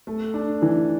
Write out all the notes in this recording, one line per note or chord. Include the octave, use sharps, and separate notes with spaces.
A3
D4
E3